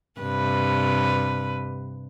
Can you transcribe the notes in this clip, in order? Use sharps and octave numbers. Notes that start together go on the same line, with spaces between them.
G2 C3 B4